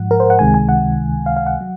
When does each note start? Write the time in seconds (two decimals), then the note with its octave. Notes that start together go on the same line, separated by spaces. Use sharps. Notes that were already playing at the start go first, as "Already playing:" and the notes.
Already playing: G#2 F3 G#3 F#5
0.11 A#4
0.20 C5
0.30 F#5
0.39 C#2 C3 D#3 G#3 G#5
0.54 G#5
0.69 F#5
1.26 F5
1.37 F5
1.46 F#5
1.61 F#3